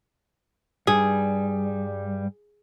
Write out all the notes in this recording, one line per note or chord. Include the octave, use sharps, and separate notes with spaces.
G2 G3 G#4